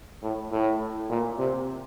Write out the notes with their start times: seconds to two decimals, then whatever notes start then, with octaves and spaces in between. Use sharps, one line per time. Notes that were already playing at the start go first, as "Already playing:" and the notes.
0.23 A2
0.52 A2
1.09 A#2
1.39 C3